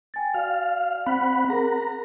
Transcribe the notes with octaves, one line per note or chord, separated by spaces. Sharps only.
G5 G#5 A6
F#4 D5 F5
C4 F#5 B5
G#4 A#4 A#5